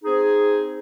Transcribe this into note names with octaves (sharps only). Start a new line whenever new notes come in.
C4 D#4 G#4